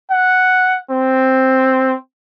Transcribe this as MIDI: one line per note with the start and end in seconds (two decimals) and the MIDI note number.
0.11 0.78 78
0.91 1.95 60